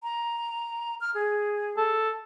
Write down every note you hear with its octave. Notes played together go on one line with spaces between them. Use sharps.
A#5
F6
G#4
A4